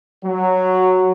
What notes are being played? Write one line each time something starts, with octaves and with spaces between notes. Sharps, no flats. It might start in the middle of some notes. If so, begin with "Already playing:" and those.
F#3